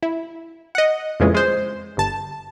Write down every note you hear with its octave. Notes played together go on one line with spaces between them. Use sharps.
E4
D#5 F#5
F2 A#2 C#3 E3 G#3
G#3 C5
G1 A5